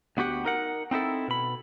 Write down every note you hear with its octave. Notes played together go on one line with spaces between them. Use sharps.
D2 B3 F#4 G4 F#5
D#4 A#4 F#5
C4 D#4 E4 A4
B2 B5